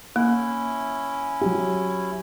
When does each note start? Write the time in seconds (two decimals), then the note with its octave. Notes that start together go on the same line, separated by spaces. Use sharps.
0.16 A#3 C#4 E4
1.41 F#3 G4